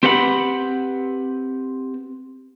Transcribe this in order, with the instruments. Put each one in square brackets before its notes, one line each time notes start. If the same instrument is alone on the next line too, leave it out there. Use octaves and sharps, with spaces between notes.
[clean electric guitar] C4 G4 B4 F#5 G5 B5